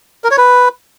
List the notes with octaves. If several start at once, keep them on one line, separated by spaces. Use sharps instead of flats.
A#4
C#5
B4